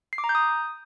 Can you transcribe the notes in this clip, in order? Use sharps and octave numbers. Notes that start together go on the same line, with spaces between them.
C7
D6
A#5
G6
D#6